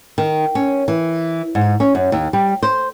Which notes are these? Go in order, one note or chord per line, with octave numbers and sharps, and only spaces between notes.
D#3
C#4
E3
G#2
C#4
F#2
D#2
G3
C5